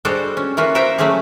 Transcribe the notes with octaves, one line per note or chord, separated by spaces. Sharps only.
G3 G#3 D4 F#4 A4 C5
C#4
E3 A#3 C#4 F4 F#4
A#4 C5 E5 F#5 G5
F#3 A3 C#4 G4 G#4